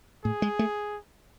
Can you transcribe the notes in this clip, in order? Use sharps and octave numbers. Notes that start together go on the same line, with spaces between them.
A2 G#4
G#3
A3